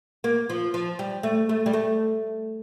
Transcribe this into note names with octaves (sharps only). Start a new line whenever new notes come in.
A#3
F3
F3
G3
A3
A3
G3
A3